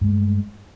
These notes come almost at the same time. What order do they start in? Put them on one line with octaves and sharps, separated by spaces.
G2 G#3 A3